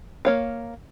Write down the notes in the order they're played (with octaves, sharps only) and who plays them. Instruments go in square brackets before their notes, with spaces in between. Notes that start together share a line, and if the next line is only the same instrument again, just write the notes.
[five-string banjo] A#3 C#5 F5